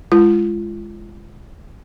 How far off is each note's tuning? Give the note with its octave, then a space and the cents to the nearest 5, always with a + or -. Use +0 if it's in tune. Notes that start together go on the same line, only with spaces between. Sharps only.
G#3 +0 F4 -35